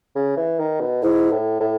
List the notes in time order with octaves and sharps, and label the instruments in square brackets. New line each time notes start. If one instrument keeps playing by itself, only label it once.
[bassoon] C#3
E3
D#3
B2
[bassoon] G#2 [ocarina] E4
[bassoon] A2
A2